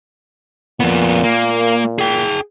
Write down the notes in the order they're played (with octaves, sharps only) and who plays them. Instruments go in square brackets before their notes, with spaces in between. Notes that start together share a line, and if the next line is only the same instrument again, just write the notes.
[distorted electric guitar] F2 B3 [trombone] A#2
[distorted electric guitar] A#3
G#4 G5